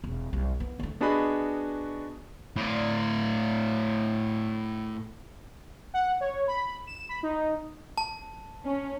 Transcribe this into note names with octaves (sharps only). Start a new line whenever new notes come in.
E1 C4
C2
B3
D2 A3
B3 D4 F#4 G#4 D#5 B5
A2 D5
F#5
C#5
B5
E7
B5
D#4
A5
C#4